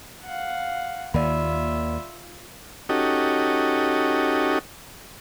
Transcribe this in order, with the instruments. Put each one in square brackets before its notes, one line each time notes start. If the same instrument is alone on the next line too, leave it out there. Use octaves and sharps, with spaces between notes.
[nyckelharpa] F5 F#5
[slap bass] D#2 D#3 A#3 [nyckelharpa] F4 E5 [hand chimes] D5 B5
[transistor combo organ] C#4 D#4 F#4 G4 A4 D#5